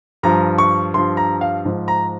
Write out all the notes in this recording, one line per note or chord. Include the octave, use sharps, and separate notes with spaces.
G2 F3 A#5
C#6
G2 F3 C6
A#5
F5
G#2 F3
A#5